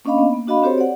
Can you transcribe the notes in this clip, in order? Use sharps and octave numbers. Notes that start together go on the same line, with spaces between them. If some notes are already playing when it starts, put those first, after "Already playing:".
A#3 C#4 D4 D#5 F5 B5
B3
A#3
D4 F#4 D#5 F5 B5
C4 F#4 G4 A4 C5 C#5
D5 F#5